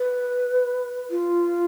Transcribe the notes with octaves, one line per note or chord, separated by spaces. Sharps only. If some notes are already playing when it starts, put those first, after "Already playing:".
Already playing: B4
F4